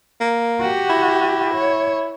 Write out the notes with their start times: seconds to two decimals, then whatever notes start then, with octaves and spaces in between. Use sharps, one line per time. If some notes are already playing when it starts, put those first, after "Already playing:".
0.21 A#3
0.61 F#4 G4
0.90 E4
1.54 C#5